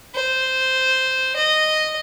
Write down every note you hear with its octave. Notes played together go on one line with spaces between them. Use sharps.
C5
D#5